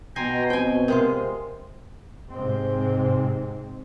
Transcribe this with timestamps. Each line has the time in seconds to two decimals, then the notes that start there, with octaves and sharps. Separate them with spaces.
0.16 B2 G5 G#5 A#5 C6
0.50 B3 C4 F#4 G5 G#5
0.88 C3 G#3 F4 A#4
2.30 G#2 C3 G#3 C4